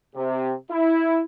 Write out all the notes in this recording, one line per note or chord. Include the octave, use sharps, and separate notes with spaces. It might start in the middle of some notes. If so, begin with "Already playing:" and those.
C3
E4